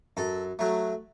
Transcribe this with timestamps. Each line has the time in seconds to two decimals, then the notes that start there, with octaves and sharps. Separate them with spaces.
0.17 F#2 A4
0.59 F#3 A3